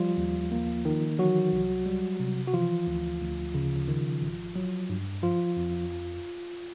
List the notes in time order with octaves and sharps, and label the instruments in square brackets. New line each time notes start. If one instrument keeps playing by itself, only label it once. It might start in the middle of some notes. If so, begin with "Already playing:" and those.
Already playing: [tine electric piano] F3 G3 F4
D#2
A#3
D#3
E3 F#3 F#4
C2
G3
C3
F#4
E3 F3 F4
D2
D2
C#3
D#3
G#1
F#3
G2
F3 F4
F2